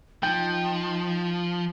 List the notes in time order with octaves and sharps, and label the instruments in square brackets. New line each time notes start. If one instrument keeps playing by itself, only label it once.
[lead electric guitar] F3 [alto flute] D#4 [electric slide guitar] G5